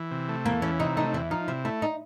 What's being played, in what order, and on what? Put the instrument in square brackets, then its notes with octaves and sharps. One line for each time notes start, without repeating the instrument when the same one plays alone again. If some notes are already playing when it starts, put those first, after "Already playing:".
Already playing: [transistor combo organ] E3
C3
A3
[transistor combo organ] E2 [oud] A#3
[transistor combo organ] E3 [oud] C#4
[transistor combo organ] C3 [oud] D#4
[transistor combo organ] A3 [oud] D#4
[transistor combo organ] E2 [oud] E4
[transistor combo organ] F3 [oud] D#4
[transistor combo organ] C3 [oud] E4
[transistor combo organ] A3 [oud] E4
[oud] D#4